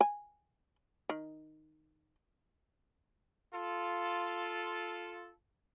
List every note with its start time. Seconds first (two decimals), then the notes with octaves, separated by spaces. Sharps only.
0.01 G#5
1.09 D#3
3.53 F4 A4